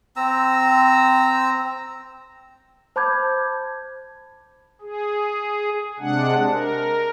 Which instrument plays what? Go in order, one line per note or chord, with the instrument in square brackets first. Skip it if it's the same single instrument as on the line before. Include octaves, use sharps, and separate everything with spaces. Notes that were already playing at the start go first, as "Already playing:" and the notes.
[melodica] C4 A#5 E6
[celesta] C5 A5 B5 D6 G6 G#6
[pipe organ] G#4
C3 G#3 D4 F#5
A#4